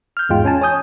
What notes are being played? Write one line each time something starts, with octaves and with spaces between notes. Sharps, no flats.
F6 G6
E2 G#2 G#3 F4 G5
C#4 G#5 A5
C#5 G#5 D#6 G6